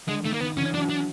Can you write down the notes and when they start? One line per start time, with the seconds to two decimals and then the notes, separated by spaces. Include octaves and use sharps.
0.09 D3 G#3
0.25 D#3 A3
0.34 A#3
0.41 D#3 B3
0.57 D3 E3 C#4
0.74 E3 F#3 D4
0.90 D4